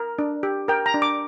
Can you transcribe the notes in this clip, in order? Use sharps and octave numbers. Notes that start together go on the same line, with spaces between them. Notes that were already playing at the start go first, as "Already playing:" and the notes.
Already playing: A#4
D4
G4
A#4 G5
A#5
D4
D6